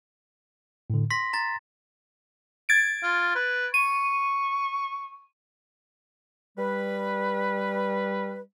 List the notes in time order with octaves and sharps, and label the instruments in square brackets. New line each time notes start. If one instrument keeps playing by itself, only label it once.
[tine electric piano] A2 D3
[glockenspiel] C6 A#6 [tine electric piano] B6
[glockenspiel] A#5 A6
[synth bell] G#6 A6 D7
[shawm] F4
B4
[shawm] C#6 [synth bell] D#7
[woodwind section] G3 B4